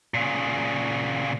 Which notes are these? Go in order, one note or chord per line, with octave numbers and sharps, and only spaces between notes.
A#2 C#3